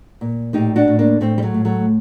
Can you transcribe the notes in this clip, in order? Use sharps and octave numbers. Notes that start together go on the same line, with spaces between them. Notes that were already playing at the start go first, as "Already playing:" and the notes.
A#2
A2 D#4 G4
D4 F#4
A2
A#3 D4
A2 A3 C4
G3
F#3 A3
A2
F#3 A3